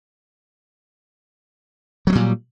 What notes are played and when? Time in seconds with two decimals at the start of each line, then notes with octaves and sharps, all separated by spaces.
2.07 F#3
2.10 B3
2.12 G3
2.15 A#2